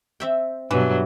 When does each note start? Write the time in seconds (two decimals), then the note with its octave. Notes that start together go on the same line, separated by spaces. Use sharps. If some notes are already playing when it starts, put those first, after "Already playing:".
0.20 C4 E5 G5
0.71 G2 B2 E3 F#3